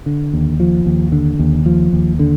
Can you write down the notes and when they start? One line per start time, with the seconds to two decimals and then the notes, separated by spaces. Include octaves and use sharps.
0.06 D3
0.33 D#2
0.60 F3
0.86 D#2
1.12 D3
1.39 D#2
1.66 F3
1.93 D#2
2.19 D3